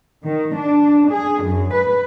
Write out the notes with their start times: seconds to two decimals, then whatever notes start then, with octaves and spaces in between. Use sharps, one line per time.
0.24 D#3
0.56 D4
1.09 G#4
1.44 F#2
1.73 B4